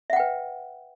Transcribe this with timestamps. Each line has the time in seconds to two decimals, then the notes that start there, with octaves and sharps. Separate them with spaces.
0.10 E5
0.13 F#5
0.16 G5
0.20 B4